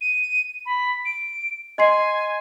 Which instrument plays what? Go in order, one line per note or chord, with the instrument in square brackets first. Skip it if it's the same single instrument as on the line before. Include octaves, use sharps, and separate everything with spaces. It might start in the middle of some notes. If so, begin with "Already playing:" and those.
[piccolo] D#7
B5
D7
[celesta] D#5 C6 C7 [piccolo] G#5